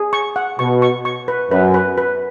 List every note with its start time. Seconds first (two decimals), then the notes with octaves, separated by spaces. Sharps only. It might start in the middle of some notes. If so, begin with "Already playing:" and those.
Already playing: G#4
0.13 C#6
0.36 F#5
0.59 B2 C#6
0.82 C#6
1.05 C#6
1.28 B4
1.51 F#2 B4
1.74 B4
1.98 B4